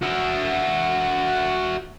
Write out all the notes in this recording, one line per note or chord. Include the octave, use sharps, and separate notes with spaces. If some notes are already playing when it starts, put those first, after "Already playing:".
F#4 E5